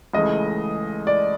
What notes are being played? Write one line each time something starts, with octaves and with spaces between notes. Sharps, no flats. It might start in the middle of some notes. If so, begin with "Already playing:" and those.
C#2 C#3 E3 A3 D#5
D5